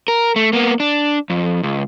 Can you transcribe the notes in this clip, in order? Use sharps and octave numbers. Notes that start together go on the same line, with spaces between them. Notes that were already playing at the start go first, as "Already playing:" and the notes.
A#4
A3
A#3 B3
D4
F2
C#2